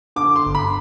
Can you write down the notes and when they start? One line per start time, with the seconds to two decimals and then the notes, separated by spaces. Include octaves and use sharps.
0.16 D3 D6
0.36 C6
0.46 G1
0.55 B5